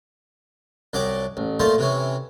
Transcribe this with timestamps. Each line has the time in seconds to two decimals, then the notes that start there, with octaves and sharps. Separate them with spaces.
0.93 C2 F#3 D5 D#5 D6
1.37 A1
1.60 A#2 A3 F4 C5 D#5
1.78 C3 E3 C#4